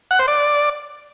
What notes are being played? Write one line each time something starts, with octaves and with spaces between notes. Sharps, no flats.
F#5
C5
D5